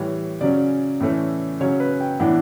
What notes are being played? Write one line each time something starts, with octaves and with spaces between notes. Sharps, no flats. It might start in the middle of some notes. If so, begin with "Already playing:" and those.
Already playing: A2 E3 G3 C#5
C#3 F#3 C#4 D5
A2 E3 A3 C#4
C#3 F#3 C#4 C#5
B4
G5
A2 E3 B3 D4 F#5